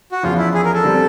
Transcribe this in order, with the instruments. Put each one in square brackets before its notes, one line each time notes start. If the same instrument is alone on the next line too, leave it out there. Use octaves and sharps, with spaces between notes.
[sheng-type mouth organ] F#4
[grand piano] E2 C#3 F3 [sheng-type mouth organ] F4
[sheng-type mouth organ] E4
G#4
A#4
A4
[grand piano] D3 G3 C4